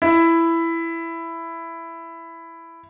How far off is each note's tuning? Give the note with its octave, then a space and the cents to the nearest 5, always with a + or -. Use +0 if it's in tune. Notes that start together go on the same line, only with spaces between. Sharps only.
E4 +10